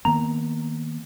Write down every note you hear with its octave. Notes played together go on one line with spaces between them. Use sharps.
D#3 A#3 B3 A#5